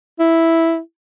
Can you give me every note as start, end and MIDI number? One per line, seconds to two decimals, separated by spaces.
0.20 0.79 64